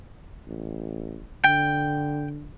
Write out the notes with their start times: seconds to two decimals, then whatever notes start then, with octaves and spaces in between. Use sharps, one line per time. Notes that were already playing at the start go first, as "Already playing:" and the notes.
0.47 A1
1.44 D3 G5